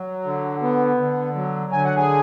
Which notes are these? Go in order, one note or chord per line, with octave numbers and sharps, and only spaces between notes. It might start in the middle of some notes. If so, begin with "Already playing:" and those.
Already playing: F#3
D3
B3
D3
F#3
D3 G#5
F#5
G#4 G#5